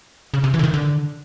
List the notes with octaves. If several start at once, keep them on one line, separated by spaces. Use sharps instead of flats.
C#3
C3
E3
D3
D#3
D3